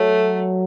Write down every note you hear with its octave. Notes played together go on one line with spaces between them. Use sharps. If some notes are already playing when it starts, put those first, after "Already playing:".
Already playing: F#3 A3